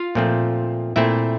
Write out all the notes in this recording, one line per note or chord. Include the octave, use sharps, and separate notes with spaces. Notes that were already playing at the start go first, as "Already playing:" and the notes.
Already playing: F4 F5
A#2 F3 A3 C4
A#2 A3 C4 E4 E5